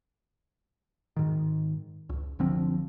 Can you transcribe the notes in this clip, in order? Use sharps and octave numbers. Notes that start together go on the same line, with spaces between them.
G#2 D#3
C#2
F#1 D3 F3 C4